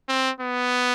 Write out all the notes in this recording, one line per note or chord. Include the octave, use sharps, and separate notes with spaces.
C4
B3